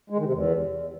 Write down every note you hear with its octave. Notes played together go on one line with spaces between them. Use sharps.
G#3
D#3
C3
E2